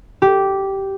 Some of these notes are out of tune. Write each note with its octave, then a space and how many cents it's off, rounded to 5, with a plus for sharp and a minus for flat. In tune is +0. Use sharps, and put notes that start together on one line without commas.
G4 -10